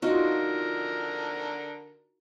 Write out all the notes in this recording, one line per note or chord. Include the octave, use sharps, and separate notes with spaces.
D3 D#4 F4 F#4 A#4